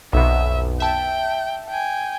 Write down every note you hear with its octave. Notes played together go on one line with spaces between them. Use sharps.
B1 F2 B2 E5
E5 G5 A5
G5 G#5